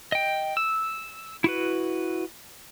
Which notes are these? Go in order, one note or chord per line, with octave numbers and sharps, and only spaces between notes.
D#5 G5
E6
E4 F#4 B4